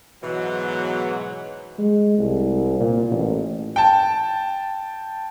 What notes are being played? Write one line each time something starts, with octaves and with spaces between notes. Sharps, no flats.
G#2 B2 E3 F#3
G#3
C2
A#2
A1
G5 A5